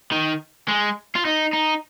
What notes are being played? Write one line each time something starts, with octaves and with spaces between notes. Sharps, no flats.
D#3
G#3
F4
D#4
D#4